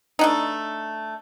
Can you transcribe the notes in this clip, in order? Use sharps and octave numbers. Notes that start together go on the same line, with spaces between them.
A3 D4 D#4